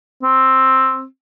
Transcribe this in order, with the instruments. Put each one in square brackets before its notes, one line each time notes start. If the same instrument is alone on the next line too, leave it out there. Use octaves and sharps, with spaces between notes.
[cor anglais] C4